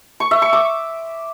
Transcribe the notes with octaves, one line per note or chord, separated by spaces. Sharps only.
C#6
E5
C#6
D6